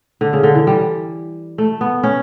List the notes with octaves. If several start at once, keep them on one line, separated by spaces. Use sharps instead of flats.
D3
C#3
D3
E3
G3
A3
B3
C#4